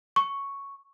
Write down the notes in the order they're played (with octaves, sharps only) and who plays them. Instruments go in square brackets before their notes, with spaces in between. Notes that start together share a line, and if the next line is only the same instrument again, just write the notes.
[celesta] C#6